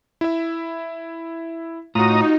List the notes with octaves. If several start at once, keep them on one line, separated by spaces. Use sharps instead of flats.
E4 E5
A2 D#4 F4 F#4 A#5 D#6